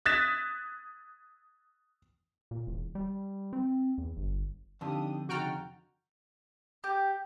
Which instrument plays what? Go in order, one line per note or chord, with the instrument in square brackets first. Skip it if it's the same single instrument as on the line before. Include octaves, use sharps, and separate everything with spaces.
[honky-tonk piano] D#6 F#6 G#6 A6 B6 E7
[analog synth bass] A#2
E1
G3
C4
E2
G1
[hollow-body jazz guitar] F2 D3 [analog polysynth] D#3 D#6 [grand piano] D4 G4
[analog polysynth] C#3 D#4 [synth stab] F#4 G5 F6 [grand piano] F#5 A#5 A6
[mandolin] G4